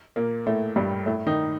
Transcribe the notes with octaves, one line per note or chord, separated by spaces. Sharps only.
A#2 A#3
A2 A3
G2 G3
A2 A3
D#3 D#4